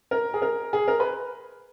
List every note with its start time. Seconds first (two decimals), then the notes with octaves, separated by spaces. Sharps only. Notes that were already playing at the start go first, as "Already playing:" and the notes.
0.11 A#4
0.34 G#4
0.42 A#4
0.73 G#4
0.88 A#4
1.00 B4